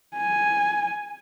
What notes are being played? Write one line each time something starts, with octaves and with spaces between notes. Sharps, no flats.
G#5